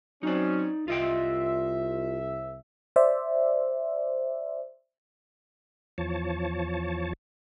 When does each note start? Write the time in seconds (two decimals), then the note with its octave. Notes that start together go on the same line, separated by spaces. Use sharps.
0.23 F#3 C4 C#4 D#4 D5
0.88 C2 F4 D#5 E5 G5
2.96 C5 D5 E5
5.98 E2 F3 C#5 A5